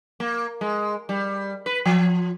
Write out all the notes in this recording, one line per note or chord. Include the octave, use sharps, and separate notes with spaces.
A#3
G#3
G3
B4
F3